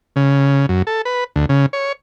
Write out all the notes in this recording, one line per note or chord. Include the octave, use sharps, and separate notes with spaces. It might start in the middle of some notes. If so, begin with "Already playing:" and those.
C#3
F#2
A4
B4
D2
C#3
C#5